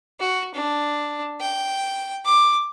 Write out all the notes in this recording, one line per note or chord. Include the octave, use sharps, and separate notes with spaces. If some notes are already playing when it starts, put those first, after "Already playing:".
F#4
D4
G5
D6